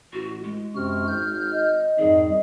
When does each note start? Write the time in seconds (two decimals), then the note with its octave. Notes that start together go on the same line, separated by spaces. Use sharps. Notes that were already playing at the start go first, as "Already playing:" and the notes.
0.13 A1 F#4
0.43 G#3
0.75 F#2 C3 F#4 F6
1.08 G#1 F6 G6
1.53 D#5
1.99 F2 G#2 D#3 G3 G#4